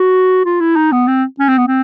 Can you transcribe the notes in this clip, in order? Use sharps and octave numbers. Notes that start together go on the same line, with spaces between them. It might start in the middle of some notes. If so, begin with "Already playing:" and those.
Already playing: F#4
F4
E4
D#4
B3
C4
C#4
C4
B3
C4